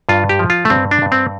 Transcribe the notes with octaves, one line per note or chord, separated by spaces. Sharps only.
G2 F4
G4
F3
F4
A3
G2 C4
D4
G2
C4